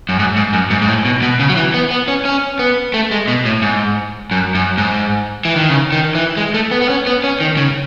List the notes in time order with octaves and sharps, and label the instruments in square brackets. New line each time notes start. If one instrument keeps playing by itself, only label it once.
[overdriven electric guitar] F#2
G#2
G#2
F#2
G#2
G#2
A2
B2
B2
C#3
F#3
E3
B3
B3
C#4
C#4
B3
A3
G#3
B2
A2
G#2
F#2
F#2
G#2
E3
D#3
C#3
D#3
E3
G#3
A3
B3
B3
C#4
B3
C#4
D#3
C#3